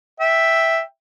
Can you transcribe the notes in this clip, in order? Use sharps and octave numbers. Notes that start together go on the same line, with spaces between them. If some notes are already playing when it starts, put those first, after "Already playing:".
E5 G5